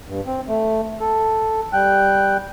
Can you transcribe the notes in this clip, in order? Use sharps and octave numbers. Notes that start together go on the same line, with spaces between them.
G2
C4
A3
A4
G3 G5 F#6